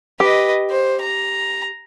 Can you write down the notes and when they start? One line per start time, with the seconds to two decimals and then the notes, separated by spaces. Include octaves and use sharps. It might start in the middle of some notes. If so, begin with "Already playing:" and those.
0.20 G4 B4 D#5
0.70 C5
1.01 A#5